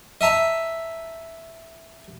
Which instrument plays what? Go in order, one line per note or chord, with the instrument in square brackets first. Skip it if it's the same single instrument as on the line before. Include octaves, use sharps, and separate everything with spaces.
[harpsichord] D#5 E5 A5 A#5